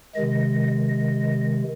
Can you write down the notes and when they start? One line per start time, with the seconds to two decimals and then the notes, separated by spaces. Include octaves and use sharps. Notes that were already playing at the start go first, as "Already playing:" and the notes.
0.15 C3 D#3 G#3 D#5
0.89 D#5